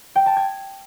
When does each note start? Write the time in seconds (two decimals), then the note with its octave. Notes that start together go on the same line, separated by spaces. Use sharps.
0.15 G5
0.26 A5
0.37 G#6